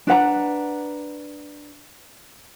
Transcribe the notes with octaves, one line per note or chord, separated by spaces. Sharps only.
D4 B4 F#5 A#5